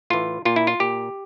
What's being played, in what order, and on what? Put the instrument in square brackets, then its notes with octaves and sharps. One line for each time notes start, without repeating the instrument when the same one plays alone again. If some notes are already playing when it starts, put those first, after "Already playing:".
[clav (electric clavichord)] A2 E3 F4
A#2 F4
E4
F4
A#2 G4